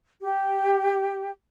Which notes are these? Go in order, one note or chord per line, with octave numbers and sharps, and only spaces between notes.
G4